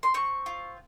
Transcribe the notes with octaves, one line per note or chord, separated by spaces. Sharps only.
C6
C4 C#6
F4